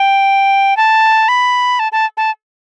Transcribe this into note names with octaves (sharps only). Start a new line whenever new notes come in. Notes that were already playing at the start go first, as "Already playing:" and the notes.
Already playing: G5
A5
B5
A5
A5
A5